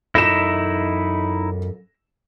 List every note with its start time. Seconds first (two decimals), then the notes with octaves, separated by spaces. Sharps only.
0.15 F#2 D#4 E4 A4 E5 A#6 E7